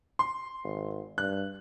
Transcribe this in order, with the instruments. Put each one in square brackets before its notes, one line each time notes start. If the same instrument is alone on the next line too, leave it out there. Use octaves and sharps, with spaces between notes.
[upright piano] C6
[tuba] G#1
[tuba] G2 [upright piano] F#6